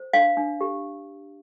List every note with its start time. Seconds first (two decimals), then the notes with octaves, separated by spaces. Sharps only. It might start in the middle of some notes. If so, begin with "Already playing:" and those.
Already playing: C5
0.13 D4 F5
0.37 D4
0.61 G4